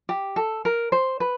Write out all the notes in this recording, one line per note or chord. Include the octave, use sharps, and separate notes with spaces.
G4
A4
A#4
C5
B4